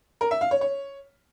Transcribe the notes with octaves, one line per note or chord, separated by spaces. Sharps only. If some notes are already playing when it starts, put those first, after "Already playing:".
A#4
E5
F5
C#5
C#5